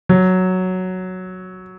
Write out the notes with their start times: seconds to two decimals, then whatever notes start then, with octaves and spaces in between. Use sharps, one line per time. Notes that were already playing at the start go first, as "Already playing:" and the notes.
0.09 F#3